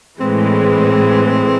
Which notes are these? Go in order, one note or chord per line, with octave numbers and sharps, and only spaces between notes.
A2 E3 G#3 C4